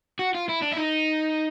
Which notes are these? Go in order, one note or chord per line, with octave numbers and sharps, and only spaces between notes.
F#4
F4
E4
D4
E4
D#4